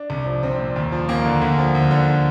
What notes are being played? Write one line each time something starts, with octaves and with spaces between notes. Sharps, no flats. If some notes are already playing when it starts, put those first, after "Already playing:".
Already playing: D4
C2
F3
C2 C4
A#2
D#2
F3
D#2 A#3
D3
D2
F3
D2
D3